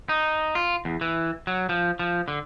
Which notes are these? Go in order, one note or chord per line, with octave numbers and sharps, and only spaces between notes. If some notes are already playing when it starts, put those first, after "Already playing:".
D#4
F4
E2
E3
F#3
F3
F3
D3